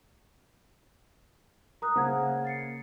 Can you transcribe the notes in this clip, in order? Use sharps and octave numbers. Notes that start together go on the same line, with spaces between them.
A#4 A#5 D#6 F#6
C#3 A#3 A#4 C5 F#5 G#6
A6 C7 C#7